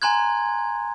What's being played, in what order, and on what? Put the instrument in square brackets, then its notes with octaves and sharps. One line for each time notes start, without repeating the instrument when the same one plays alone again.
[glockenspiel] G#5 A#5 C6 F#6 G#6